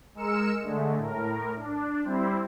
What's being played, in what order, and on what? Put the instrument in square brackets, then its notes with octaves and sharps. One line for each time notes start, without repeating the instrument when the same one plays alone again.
[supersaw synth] G#3 A#4 E6 C#7 E7
D3 G#3 A3
A2 A#4
D4
G3 C4 E4 C5